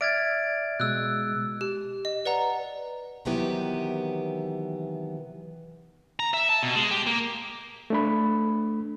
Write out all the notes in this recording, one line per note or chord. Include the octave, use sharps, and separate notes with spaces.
D5 E5 F6 G#6 A6 D7
B2 G#3 E6 F#6
G4
D#5
B4 D5 F#5 A#5
C3 D#3 E3 F#3 B3 G4
A#5
E5
A5
B2
G#3
G4
A#3
A3 D4 B5